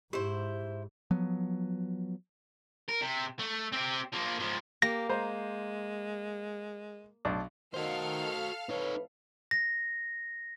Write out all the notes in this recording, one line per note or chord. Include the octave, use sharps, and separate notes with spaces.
G#2 E4 G4 C5
F3 F#3 B3
A#4
C3
A3
C4 G4
F3 A#3
G#2 F3
A#3 G4 A#6
G#3 C5 A#5
B1 D4
D#3 F#4 A4 C5 F5 F6
F2 A2 D#4 B4 C#5
A#6